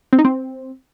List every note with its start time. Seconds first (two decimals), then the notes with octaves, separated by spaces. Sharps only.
0.13 C4
0.19 D#4
0.25 C4